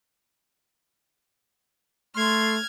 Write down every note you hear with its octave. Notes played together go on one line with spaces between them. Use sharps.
A3 C6 F6 G#6